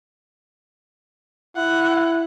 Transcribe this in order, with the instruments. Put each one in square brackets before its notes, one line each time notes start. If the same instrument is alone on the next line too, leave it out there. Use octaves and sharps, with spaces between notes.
[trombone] E4 [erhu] F#5